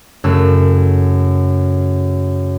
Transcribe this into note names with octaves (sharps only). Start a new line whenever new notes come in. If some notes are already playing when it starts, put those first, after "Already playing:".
F#2 C#3 A3 E6